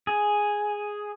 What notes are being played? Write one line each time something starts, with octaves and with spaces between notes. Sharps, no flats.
G#4